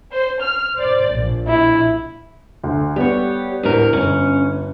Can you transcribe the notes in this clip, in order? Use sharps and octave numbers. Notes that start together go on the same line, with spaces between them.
C5
F6
C5 D5
A#1
E4
D2
G3 B3 G4 C#5
D2 A2 A#4
G1 C#4